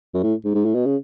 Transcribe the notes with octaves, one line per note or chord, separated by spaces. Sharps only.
F#2
A2
G#2
G#2
A2
B2
C#3